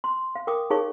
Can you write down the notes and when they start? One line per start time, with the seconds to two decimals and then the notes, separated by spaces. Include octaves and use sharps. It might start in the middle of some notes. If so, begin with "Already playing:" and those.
0.04 C6
0.36 F5
0.47 A#4 G5 D6 D#6
0.70 D#4 G#4 A#4 C#5 F5 C#6